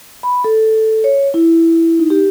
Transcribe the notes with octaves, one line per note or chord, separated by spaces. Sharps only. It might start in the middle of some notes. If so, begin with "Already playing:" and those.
B5
A4
C#5
E4
D#4
G4